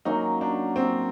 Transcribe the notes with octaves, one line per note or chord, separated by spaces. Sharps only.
F#3 A#3 C#4 D#4 F#4
D4
C4